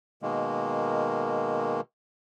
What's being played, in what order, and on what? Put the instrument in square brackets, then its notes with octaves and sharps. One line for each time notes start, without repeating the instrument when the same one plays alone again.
[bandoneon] B2 D#3 G#3 A#3